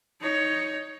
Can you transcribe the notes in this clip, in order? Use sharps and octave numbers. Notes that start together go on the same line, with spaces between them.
D#4 C#5